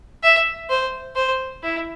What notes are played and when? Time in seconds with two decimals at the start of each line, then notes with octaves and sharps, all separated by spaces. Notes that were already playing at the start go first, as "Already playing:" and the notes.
0.23 E5
0.70 C5
1.16 C5
1.63 E4